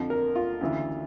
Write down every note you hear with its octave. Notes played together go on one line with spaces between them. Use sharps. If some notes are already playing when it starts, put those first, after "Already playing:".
Already playing: F2 D3 F3
A#4
F4
D2 C#3 E3